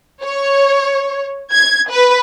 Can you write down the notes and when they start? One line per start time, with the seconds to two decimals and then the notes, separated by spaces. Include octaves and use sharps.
0.24 C#5
1.52 G#6
1.91 B4